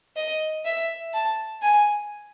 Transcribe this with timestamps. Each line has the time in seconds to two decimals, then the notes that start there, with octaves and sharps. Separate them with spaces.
0.16 D#5
0.65 E5
1.13 A5
1.62 G#5